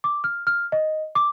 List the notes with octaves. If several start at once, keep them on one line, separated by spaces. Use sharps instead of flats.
D6
F6
F6
D#5
D6